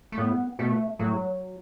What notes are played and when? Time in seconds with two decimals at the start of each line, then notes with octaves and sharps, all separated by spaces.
0.12 A3
0.18 A2 B3
0.59 B2 A3
0.99 A2 F#3